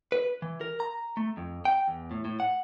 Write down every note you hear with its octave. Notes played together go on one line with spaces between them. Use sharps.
B4
E3
A#4
A#5
A3
F2
G5
E2
A2
A2
F#5